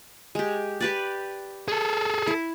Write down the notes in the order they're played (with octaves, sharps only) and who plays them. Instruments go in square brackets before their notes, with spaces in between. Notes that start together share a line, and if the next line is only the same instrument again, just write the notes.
[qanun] G#3 G4
G4 B4 D5
[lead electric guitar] G#4 A4
[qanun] E4